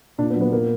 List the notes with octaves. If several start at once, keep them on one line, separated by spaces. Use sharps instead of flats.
A#2 D4
B3
F#3
B3
A#2 A#3